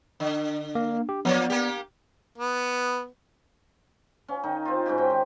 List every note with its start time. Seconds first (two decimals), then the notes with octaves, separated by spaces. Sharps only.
0.20 D3
0.75 A#3
1.09 G4
1.25 F3 A#3 B3 D5
1.50 A#3 G4
2.38 B3
4.28 C#4 F5
4.44 D#3 D#4
4.65 C4 F4
4.86 G#2 C#3 F#4 G4
4.98 D#4 C5 G5
5.10 D#3